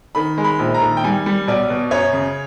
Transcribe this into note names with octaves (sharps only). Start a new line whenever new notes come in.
D#3 B5
G#3
B5
A#1
A#5
D#3
G5
G3 G#5
G3
B1 D5
B2
F#2 C#5
C#3